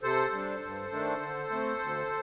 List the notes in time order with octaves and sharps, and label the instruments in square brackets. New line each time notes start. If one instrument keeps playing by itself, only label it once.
[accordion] C3 A4 C5
G3 D4
G2
D#3 A3 D4
D3
A3 C4
D2